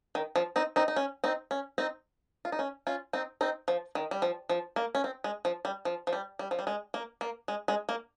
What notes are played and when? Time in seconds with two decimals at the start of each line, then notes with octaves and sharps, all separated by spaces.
0.15 D#3
0.36 F3
0.56 C4 D#4
0.76 C4 D#4
0.88 D#4
0.96 C#4
1.24 C4 D#4
1.51 C#4
1.78 C4 D#4
2.45 F4
2.52 D#4
2.59 C#4
2.87 C#4 F4
3.13 C4 D#4
3.41 C4 D#4
3.68 F3
3.95 D#3
4.11 G3
4.22 F3
4.49 F3
4.76 A#3
4.95 C#4
5.04 C4
5.24 G#3
5.45 F3
5.65 G3
5.85 F3
6.07 F3
6.13 G3
6.39 G3
6.51 F3
6.59 G3
6.67 G#3
6.94 A#3
7.21 A#3
7.48 G#3
7.68 G#3
7.89 A#3